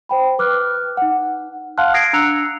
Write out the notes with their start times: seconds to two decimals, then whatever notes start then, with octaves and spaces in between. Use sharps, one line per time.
0.09 C5 G5 B5
0.39 B4 D6 F6 F#6
0.97 D#4 F#5
1.78 F5 F#5 A5 C6 F6 F#6
1.94 D#6 G#6 A#6 C7 D7
2.13 D4 A#5 E6 F#6 C#7 F7